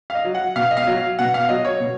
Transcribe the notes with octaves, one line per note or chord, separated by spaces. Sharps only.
F5
D#5
F#3
F#5
B2 F5
D#5
F5
F#3
F5
B2 F#5
F5
F#3 D#5
C#5
B2